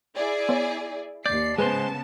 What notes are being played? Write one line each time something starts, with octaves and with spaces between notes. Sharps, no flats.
E4 G#4 D5
B3 C#5
D#2 D5 G6 C7
C#3 G#3 B3 G#4 B4 C5 A5